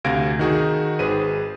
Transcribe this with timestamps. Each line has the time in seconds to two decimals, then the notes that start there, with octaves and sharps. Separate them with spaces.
0.04 D2 C3 F5 G#6 A#6 D7
0.39 D#3 D#4 F#4 G#4
0.99 G#1 G#4 B4 C5 D#7